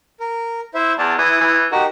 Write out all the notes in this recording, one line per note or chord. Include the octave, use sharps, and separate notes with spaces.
A#4
E4 C5 E5
E2 D5 A5
E3 E4 D#6
E3
D#4 F#4 G4 A#4